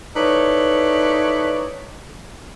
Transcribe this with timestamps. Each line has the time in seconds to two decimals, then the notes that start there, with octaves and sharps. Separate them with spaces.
0.16 D#4 E4 A4 B4 C#5 D5